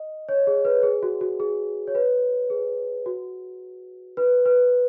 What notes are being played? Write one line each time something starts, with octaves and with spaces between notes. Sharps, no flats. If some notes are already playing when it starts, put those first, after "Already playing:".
Already playing: D#5
C#5
G#4
B4
G#4
F#4
F#4
G#4
C#5
B4
G#4
F#4
B4
B4